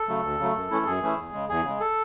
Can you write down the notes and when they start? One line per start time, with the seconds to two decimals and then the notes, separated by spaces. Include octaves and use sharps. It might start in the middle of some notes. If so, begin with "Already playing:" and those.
Already playing: A4
0.08 C#3 F#3 A3
0.23 D2
0.40 C#3 F#3 A3
0.55 F#2
0.70 E3 A3 C#4 E4
0.86 F#2 G#4
1.02 E3 A3 C#4 E4
1.18 E2
1.33 C#3 G#3
1.49 E2 G#4
1.65 C#3 G#3
1.80 A4